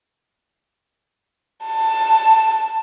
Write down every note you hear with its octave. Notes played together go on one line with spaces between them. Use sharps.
A5